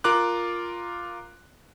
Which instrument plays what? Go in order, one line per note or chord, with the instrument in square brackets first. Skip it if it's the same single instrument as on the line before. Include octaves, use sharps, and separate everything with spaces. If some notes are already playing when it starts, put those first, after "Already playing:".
[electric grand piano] F4 A#4 D6 F#6